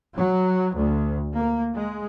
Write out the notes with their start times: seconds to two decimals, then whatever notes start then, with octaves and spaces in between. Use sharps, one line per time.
0.15 F#3
0.75 D2
1.36 A#3
1.74 G#3